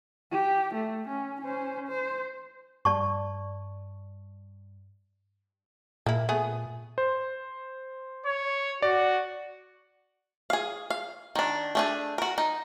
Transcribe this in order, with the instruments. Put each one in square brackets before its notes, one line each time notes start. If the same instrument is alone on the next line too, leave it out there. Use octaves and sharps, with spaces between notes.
[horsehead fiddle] G4
A3
C#4
C#4 C5
C5
[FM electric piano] G2 [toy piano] D5 A5 C#6
[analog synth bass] A#2 [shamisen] A#3 E4
[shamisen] A3 B3 G#4
[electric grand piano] C5
[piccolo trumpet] C#5
[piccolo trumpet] F#4 [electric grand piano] D5
[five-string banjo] G#4 F5
F5
D#3 D4
A3 D4 G#4
F#4 A#4
D#4